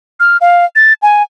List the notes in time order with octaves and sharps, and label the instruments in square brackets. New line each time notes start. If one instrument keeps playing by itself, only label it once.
[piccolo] F6
F5
A6
G#5